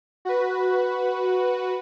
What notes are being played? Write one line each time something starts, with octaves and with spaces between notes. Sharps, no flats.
F#4 B4